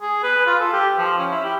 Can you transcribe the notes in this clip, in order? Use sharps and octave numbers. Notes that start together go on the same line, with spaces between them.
G#4
B4
F4
A4
G4
F3
C#4
E4
G4